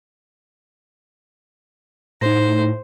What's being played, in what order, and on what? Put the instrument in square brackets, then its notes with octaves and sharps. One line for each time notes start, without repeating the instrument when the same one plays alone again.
[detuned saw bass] A2 [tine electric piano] D#4 A#6 [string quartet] C5